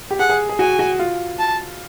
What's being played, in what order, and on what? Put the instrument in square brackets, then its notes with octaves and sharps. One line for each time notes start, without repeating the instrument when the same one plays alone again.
[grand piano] G4
[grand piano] G#4 [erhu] F#5
[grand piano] G#4
G#4
[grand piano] F#4 [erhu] G#5
[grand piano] F#4
F4
[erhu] A5